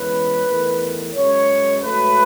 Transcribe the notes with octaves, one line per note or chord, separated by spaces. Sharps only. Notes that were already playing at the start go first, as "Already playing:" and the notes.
Already playing: E2 C#3 G#3 B4
E2 D#3 A3
F#2 C#3 G#3 C#5
G#2 F#3 A3 B4